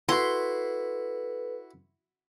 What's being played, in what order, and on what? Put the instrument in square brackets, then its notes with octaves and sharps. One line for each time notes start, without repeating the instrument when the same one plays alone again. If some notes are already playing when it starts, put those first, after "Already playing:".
[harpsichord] E4 F#4 [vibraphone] A4 B4 [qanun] C6